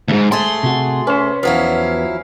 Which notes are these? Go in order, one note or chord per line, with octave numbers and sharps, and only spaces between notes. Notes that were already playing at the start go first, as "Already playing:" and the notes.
D2 G#2
A3 G#4 A4 C6
C3 F#4
C#4 B4 C5
E2 F3 F#3 E4 B4 F5